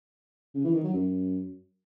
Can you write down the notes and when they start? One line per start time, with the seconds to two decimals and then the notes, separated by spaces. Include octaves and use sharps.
0.55 C#3
0.64 E3
0.74 D#3
0.84 F#3
0.93 F#2